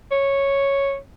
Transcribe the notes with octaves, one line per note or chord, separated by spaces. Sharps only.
C#5